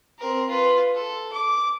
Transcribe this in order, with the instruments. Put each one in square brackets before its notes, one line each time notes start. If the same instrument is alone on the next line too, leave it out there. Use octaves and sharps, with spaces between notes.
[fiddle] C4 A#4
F4 B4
A4
D6